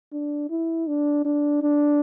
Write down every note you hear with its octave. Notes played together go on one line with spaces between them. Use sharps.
D4
E4
D4
D4
D4